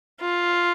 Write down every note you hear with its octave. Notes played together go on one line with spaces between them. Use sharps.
F4